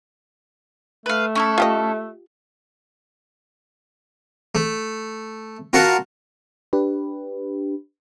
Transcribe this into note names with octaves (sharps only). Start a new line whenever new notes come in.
A3 B4 F5
C#4 E4 A4
F4 G4 D#5
A3
F4 F#4 A#4 F#5 A5
D4 G4 B4